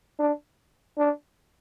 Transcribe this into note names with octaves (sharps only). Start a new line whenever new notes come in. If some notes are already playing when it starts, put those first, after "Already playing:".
D4
D4